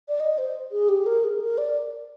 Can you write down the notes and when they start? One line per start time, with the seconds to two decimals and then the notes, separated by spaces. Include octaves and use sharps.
0.09 D5
0.20 D#5
0.38 C5
0.72 G#4
0.89 G4
1.06 A#4
1.24 G#4
1.40 A#4
1.58 D5